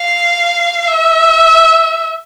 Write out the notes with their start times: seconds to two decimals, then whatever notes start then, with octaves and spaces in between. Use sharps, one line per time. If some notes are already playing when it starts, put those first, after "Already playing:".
Already playing: F5
0.87 E5